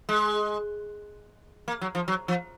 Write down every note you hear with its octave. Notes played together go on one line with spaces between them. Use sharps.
G#3
A#3
F#3
F3
F#3
F3